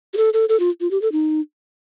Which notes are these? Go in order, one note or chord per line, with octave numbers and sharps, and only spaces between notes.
G4
A4
A4
A4
F4
F4
G4
A4
D#4